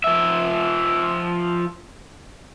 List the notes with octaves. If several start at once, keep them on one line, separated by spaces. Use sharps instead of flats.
F3 E5